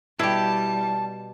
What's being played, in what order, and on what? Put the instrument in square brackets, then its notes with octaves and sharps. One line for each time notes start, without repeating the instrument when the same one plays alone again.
[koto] B2 G4 [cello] G3 [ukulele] E4 [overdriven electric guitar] A5